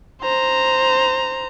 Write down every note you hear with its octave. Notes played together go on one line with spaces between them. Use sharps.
C5 A#5